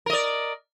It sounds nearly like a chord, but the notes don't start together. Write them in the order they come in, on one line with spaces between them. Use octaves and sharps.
A#4 D#5 D5